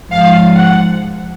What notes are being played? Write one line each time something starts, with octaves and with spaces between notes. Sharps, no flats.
G#2 F3 F5
F#5